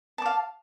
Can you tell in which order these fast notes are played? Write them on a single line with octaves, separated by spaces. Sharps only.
A5 D6 F5